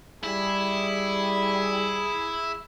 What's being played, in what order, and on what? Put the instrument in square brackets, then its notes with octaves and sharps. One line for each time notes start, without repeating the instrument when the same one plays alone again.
[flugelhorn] G3 [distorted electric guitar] E4 [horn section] G#4